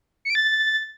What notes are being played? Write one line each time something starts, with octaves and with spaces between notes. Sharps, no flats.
C#7
D7
A6